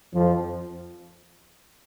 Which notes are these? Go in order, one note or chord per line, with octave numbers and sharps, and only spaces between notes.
F2 F3